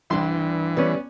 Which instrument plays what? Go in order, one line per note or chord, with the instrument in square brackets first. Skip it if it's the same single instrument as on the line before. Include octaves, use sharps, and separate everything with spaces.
[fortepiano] C2 C6 [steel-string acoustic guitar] G2 D4 G5 [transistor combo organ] E3
[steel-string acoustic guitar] G3 [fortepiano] B3 C#4